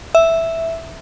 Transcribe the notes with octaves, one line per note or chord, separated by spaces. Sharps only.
E5